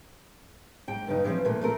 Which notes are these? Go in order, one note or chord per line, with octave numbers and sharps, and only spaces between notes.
G#2 G5
G2 C#3 D#4
E3 F3 G3 C4 C#4
A#2 E3 A3
A3 C4 A#4